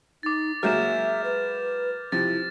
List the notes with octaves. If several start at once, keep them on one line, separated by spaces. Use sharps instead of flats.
D#4 D6 A6
F#3 G#3 A#3 E5 F6 G6 E7
B4
C3 F3 E4 A6